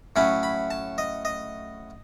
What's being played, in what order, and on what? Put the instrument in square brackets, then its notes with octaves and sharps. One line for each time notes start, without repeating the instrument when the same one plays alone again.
[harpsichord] A2 F#3 C#4 B5
B5
A5
D#5
D#5